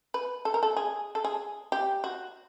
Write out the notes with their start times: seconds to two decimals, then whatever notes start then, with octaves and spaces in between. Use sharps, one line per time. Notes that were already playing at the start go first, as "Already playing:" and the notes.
0.14 B4
0.45 A4
0.54 A#4
0.63 A4
0.77 G#4
1.15 A4
1.25 G#4
1.72 G4
2.04 F#4